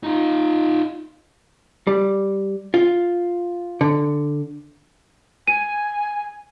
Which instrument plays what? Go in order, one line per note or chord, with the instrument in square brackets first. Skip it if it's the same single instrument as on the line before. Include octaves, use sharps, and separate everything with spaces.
[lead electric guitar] D#4 F4
[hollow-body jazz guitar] G3
F4
D3
[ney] G#5 [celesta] D#7